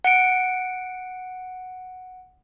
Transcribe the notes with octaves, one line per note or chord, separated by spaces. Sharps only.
F#5 C#7 D7